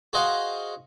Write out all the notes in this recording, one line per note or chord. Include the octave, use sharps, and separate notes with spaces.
F#4 G#4 C5 D#5 F5 F#5